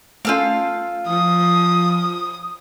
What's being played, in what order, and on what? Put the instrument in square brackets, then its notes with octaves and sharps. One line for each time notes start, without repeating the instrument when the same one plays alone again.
[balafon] A3 C#4 [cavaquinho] F4 A4 F5
[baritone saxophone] F3 [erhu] D#6